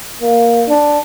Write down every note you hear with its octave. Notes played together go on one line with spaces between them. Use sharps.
A#3
D4